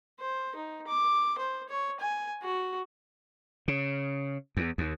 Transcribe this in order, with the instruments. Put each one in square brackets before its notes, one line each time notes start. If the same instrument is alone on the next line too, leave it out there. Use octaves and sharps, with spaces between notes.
[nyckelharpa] C5
D#4
D6
C5
C#5
G#5
F#4
[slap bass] C#3
E2
D#2